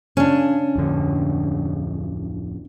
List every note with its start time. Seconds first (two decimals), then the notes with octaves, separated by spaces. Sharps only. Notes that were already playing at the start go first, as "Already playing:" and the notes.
0.17 C#3 C#4 D4
0.76 D1 F2 D3